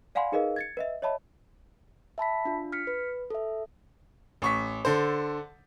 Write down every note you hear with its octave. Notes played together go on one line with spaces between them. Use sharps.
D5 F5 F#5 G#5 B5 C6
D#4 G#4 A#4 B4 D#5 F5
G#6 A6 C#7
B4 D#5 E5
C#5 D#5 E5 A5 B5
E5 A5 B5 B6
D4 F4
F6 B6 C#7
B4
A4 E5
A1 C#6 B6
D3 A4 C5